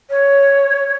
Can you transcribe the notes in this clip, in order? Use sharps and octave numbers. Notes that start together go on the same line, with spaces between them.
C#5